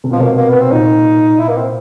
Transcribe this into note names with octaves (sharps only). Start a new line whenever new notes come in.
C3
B2 F3
C3 A#3
A#3
B3
C4
A#2 D#4
E4
A#3
C4